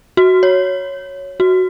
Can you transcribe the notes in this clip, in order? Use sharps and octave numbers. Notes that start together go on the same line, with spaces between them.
F#4
C#5
F#4